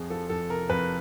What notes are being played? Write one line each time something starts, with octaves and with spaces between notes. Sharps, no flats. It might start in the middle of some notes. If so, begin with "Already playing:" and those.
Already playing: F2 G#4
F3 A4
F2 A4
C3 A#4
F2 B4